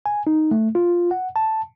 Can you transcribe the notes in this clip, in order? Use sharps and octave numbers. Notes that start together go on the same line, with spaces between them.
G#5
D#4
A3
F4
F#5
A5